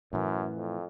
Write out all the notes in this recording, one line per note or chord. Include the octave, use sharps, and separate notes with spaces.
F#2 A2 E3
F2